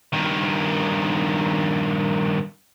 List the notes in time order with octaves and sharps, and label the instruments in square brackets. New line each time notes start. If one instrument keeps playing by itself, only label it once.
[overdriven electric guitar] G2 D#3